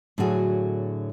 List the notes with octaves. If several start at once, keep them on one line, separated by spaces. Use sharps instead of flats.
A2 D3 F#3 F#4 G#4